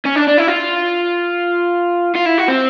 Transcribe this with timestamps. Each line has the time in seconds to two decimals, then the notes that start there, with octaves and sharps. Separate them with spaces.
0.06 C#4
0.16 D4
0.28 D4
0.38 E4
0.48 F4
2.16 F4
2.26 E4
2.38 F#4
2.48 C4